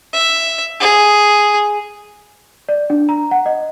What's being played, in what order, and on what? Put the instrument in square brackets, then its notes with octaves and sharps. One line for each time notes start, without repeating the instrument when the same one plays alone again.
[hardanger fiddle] E5
G#4
[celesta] D5
D4
A#5
F#5
D#5